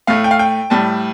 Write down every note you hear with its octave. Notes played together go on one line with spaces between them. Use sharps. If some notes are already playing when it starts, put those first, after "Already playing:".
A2 A3 F5
G5
F5
G5
A2 G3 A5